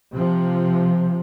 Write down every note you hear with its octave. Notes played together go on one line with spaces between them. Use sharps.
C3 F3